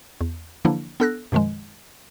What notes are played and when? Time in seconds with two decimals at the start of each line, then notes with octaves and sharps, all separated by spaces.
0.21 E2
0.65 D3 E3 F3 A#3 D4 E4
1.00 B3 D4 A4 E6 F#6 A#6
1.32 F#2 B2 D#3 F3 G#3